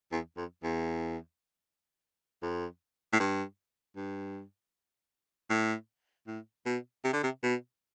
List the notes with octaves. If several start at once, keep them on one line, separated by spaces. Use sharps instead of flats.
E2
F2
E2
F2
A2
G2
G2
A2
A2
B2
C3
D3
C3
B2